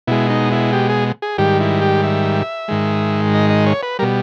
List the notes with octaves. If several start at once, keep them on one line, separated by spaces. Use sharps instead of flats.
B2 G#3 E4
D#4
E4
G4
G#4
G#4
G#2 D#3 G3 G4
E4
G4
E5
G#2 D#3 G#3
D#5
D#5
C#5
B4
B2 G3 A#4